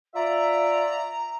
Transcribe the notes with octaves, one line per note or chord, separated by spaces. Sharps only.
F4 D5 E5 A#5